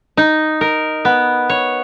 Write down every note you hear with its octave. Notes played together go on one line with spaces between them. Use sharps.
D#4
A#4
B3
C#5